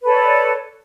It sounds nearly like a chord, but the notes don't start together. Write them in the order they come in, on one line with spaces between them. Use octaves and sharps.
B4 A4 C#5 D5